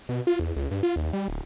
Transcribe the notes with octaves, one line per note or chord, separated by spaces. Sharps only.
B2
F4
E2
C#2
G2
F4
D#2
G3
D1